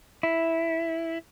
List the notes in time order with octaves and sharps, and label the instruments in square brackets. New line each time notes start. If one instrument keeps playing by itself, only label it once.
[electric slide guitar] E4